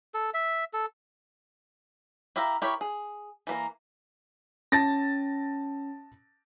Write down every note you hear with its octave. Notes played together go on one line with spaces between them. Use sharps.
A4
E5
A4
E4 G4 E5 F5 A#5
E4 G4 A#4 C#5
G#4
E3 A#3 A#5
C#4 A5 A6 A#6